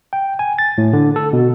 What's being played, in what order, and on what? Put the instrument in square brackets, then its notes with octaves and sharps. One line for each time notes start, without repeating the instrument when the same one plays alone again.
[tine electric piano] G5
G#5
A6
A2
D3
A4
B2